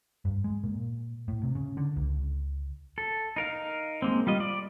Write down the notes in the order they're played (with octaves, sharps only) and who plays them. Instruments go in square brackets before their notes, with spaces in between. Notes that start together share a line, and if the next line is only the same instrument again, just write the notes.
[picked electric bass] G2
G#3
A#2
A2
C3
C#3
D3
C#2
[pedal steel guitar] A4
D#4 A#4 F5
G#3 A#3 C4
G3 F4 D#5
D5